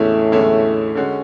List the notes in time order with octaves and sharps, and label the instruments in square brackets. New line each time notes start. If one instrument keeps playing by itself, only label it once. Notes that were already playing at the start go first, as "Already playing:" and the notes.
Already playing: [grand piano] E2 D3 G#3 C#4 E4 [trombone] A2
[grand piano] E2 D3 G#3 C#4 E4
D3 G#3 C#4 F#4